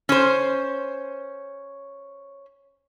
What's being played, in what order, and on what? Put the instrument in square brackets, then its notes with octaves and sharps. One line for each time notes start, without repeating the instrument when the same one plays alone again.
[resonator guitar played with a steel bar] C#4 C5